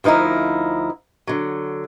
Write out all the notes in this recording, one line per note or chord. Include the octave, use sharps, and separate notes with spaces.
D2 F3 D#4 E4 A#4
D3 F#3